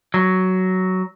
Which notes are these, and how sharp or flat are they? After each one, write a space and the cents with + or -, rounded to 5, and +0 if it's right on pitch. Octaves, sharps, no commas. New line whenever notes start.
F#3 +10